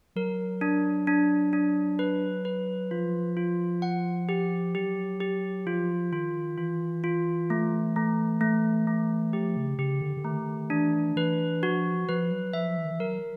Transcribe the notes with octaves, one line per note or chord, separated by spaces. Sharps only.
F#3 A#4
D4
D4
D4
B4
B4
F3 F4
F4
F#5
G4
F#3 G4
G4
F3 F4
D#3 F4
E3 F4
F4
A3
A3
A3
A3
F3 G4
C#3
C#3 G4
D3
D3
D#3 A3
E3 D4
E3 B4
F3 F#4
F3 B4
F#3
F3 E5
E3
D#3
E3
F#3 A#4